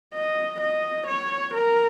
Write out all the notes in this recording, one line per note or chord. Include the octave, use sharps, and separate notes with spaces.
D#5
D#5
C#5
A#4